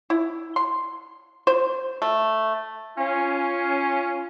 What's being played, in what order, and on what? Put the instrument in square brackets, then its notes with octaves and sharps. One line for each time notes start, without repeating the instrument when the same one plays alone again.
[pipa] E4
C6
C5
A3
[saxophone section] C#4 F4